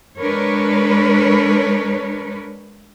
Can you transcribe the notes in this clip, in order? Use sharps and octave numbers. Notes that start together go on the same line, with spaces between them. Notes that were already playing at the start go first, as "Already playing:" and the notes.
G#3 D4 A#4 B4 C#5